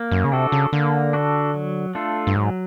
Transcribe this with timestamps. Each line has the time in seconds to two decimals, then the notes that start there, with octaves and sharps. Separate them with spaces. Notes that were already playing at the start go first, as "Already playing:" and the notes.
Already playing: A#3
0.11 F#2
0.24 C#3
0.32 C3 D4 F#4 A4
0.52 C#3
0.73 D3 A#3
1.13 D4 F#4 A4
1.54 F#3
1.95 A3 D4 F4 A4
2.27 G2
2.35 G#2 F#3